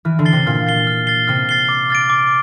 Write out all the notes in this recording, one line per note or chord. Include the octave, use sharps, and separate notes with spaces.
E3 F6
D3
A6 C7 G7
C3
A#2 F6
A6 C7 G7
F6
A6 C7 G7
C3 F6
A6 C7 G7
D6
F6 A6 D7
D6